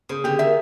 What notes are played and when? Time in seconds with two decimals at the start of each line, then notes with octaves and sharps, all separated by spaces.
0.09 C#3 C5
0.24 D3 G4
0.39 D#3 E5